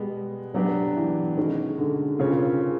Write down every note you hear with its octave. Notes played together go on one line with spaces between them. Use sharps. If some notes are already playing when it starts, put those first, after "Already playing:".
Already playing: B2 G3 G#3 B3
F#3 B3 D4 G4 B4
E3
D#3 G#3 C#4 F#4
D3
C#3 C4 F4 A#4 C#5